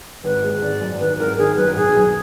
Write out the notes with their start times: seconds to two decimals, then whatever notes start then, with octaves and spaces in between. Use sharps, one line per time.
0.24 G#1 B4
0.43 G#3
0.62 G#1 D5
0.81 F#2
1.00 D#3 B4
1.19 G#1 A#4
1.38 D#3 G#4
1.57 F#2 B4
1.76 B1 G#4
1.96 B1